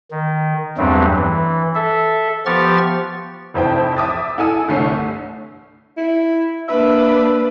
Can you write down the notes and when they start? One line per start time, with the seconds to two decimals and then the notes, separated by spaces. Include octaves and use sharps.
0.11 D#3
0.78 E2 G2 F#3 G3 A3 C4
1.16 E3
1.75 A4 E5
2.46 F3 B3 G4 C#6 F6 A6
3.54 F1 F2 E4 C5 E5 G5
3.97 E5 D6 D#6 A6
4.38 E4 A4 G#5 E6
4.68 G1 C2 D3 A3 C#5 C7
5.97 E4
6.68 A#3 D4 B4 E5